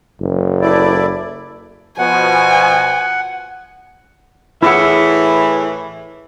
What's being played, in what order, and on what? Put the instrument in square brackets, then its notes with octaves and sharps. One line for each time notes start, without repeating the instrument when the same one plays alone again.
[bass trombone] F#1
[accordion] A3 E4 D5
[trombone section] B2 F3 [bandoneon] F#5 [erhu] G#5
[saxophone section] A2 E3 [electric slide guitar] E4 G#4 F#5